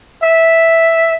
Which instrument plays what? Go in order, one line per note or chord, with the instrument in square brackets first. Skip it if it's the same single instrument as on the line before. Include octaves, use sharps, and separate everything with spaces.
[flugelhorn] E5